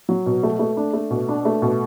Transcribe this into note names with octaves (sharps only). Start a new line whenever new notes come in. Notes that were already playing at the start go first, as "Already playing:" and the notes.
F#3
B2
A3
A3
D4
A3
B2
D4
A3
B2